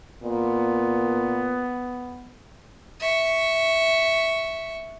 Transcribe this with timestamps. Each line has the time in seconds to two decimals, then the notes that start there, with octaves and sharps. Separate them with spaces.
0.23 A#2 B3
3.00 E5 C#6